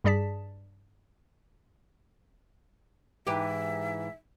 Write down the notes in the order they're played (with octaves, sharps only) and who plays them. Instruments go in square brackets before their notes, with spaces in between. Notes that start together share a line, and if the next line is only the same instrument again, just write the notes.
[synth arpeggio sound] G2 G3 G#4 D5 A5 B6
[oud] G#2 E3 G4 [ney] E5